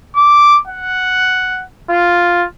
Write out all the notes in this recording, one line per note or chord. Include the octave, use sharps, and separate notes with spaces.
D6
F#5
F4